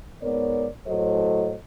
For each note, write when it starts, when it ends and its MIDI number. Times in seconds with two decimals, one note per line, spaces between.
0.22 0.67 44
0.22 0.67 59
0.22 0.67 70
0.22 0.67 73
0.22 0.67 74
0.87 1.55 45
0.87 1.55 54
0.87 1.55 69
0.87 1.55 72
0.87 1.55 75